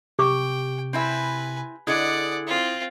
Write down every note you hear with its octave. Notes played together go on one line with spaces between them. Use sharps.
C3 G4 G5 C#6 D6
C4 E4 B4 E5 G#5
D3 E4 G#4 D5 D#5 F#5 D#6 G#6
C4 F4